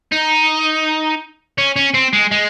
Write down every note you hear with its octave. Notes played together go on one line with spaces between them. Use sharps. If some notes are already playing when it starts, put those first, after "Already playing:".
D#4
C#4
C#4
C4
G#3
G#3